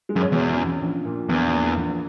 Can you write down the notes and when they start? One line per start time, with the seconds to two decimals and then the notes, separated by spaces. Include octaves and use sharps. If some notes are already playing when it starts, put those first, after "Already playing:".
0.09 G#3
0.16 F#2
0.32 E2 B2
0.56 C#4
0.81 A#1
1.05 A#2
1.28 A#1 E2
1.53 A#3
1.77 A#1